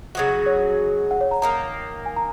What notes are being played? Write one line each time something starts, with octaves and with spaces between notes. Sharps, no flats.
C#3 F#3 D#4 F#4
C#5
F#5
C#5
A#5
D#3 A#3 D#4 A#5
G#5
A#5